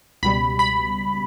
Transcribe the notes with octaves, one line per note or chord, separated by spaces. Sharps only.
C#2 B2 G3 B5
B5